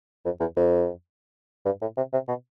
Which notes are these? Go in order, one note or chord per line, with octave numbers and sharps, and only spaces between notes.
F2
E2
F2
G2
A2
C3
C3
B2